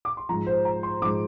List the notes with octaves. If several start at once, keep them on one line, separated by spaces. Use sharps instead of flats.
D6
C6
G#2 F3 A#5
C5
A#5
C6
G#2 F3 D6